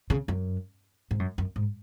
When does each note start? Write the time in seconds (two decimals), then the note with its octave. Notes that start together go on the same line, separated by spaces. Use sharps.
0.10 C#3
0.28 F#2
1.11 G#2
1.20 F#2
1.38 F#2
1.56 G#2